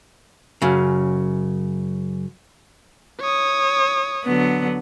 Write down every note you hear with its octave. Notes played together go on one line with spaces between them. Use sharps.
F#2 C#3
C#5 D#6
D3 F#3 B3